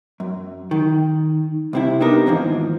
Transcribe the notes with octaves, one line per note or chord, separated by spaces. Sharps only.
F#2
D#3
C2 C3 E4
B3 D4 D#4 G4 A#4
D#2 G#2 E3 F3